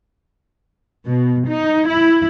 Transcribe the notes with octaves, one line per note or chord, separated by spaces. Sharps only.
B2
D#4
E4